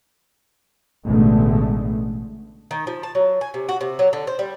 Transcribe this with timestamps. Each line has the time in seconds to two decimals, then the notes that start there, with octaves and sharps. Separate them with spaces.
1.03 A1 B2 D3 G#3 A3
2.71 D#3
2.87 F3
3.03 A5
3.15 F#3
3.41 G#5
3.54 C3
3.69 F#4
3.81 C3
3.99 F#3
4.13 D3
4.27 C5
4.39 G3